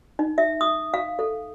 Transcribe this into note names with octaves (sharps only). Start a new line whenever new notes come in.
D#4
E5
D#6
F5
A4